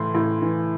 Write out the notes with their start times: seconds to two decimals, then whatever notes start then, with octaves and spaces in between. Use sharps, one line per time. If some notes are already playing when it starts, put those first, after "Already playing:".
Already playing: A2 E3 C6
0.15 A2
0.42 E3